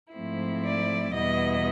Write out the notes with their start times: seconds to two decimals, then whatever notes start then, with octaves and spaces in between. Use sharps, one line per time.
0.14 G#2 F3 A3 C4 E4
0.65 D5
1.14 E2 B2 G3 B3 E4 D#5